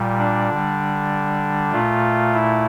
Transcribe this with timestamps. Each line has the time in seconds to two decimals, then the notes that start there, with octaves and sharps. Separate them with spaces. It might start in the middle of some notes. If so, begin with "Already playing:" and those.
Already playing: A#2 G3
0.19 D4
0.49 D3
0.54 G3
1.72 A#2 A3 F4
2.33 E4